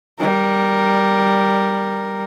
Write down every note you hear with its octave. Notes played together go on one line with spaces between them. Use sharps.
G3 A#4